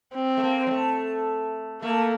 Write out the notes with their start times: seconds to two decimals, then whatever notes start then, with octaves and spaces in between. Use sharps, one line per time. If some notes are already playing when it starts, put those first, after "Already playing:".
0.15 C4
0.37 A3
0.43 A#3
0.67 F#3
0.71 A3
1.82 A3 A#3